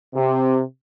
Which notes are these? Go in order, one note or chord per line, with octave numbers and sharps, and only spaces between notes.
C3